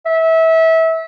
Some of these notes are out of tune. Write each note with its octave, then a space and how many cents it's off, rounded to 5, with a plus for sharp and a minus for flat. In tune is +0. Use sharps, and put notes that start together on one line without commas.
E5 -25